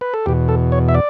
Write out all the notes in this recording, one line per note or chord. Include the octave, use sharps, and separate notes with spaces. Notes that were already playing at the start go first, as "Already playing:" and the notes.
B4
A4
E2 B2 G4
A4
C#5
E5
D5